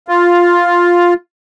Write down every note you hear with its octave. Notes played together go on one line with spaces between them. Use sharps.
F4